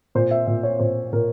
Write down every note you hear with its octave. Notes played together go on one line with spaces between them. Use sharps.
A#2 C5
E5
A#2 E5
C#5
A#2 C5
A#2 A#4